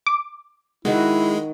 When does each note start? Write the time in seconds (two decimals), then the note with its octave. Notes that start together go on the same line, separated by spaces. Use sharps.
0.07 D6
0.85 D#3 G#3 E4 F#4